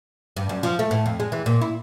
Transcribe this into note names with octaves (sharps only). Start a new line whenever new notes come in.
G2
F#2
F3
A3
A2
F2
G#3
E3
A#2
E4